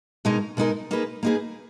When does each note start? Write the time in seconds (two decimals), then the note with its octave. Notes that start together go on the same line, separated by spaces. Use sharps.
0.25 B2 G#3 D#4 A#4
0.57 B2 G#3 D#4 A#4
0.91 A#3 D#4 G#4 B4
1.23 A#3 D#4 G#4 B4